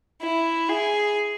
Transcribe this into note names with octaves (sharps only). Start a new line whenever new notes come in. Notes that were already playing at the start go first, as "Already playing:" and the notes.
E4
G#4